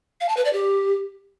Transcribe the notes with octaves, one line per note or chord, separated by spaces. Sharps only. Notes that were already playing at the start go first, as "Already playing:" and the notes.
F5
A5
B4
D5
G4